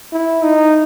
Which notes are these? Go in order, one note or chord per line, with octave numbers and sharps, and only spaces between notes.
E4
D#4